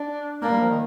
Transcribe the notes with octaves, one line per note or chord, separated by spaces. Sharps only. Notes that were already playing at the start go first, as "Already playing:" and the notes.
Already playing: D4
A#3 D4
G3
F3
D#3